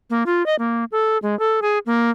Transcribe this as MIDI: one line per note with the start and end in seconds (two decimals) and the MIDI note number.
0.10 0.24 58
0.26 0.45 65
0.46 0.55 75
0.59 0.85 58
0.92 1.18 69
1.22 1.37 56
1.39 1.60 69
1.62 1.79 68
1.86 2.10 58